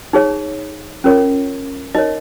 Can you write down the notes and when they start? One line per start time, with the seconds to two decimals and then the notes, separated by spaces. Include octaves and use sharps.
0.13 D#4 G#4 C#5
1.04 C#4 F4 A#4 C#5
1.95 D#4 A#4 C#5 D#5